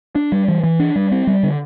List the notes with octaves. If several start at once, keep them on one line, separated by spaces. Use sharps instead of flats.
D4
G3
E3
E3
D4
G3
C4
G3
D3